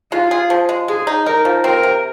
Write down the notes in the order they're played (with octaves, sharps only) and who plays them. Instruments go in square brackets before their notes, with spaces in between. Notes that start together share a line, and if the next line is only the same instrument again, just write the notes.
[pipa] G#3 [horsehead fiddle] F4
[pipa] G#4
F3
G#3
[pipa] G#3 [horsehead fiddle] G#4
[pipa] D#4
[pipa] D#4 [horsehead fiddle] A#4
[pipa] F3
[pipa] C4 [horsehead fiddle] A#4
[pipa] C3